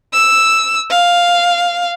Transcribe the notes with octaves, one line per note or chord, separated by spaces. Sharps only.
E6
F5